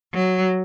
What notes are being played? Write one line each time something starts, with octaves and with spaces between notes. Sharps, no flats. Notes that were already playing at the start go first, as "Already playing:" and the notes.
F#3